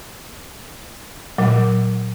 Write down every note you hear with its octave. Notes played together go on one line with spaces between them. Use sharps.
A#2 F#3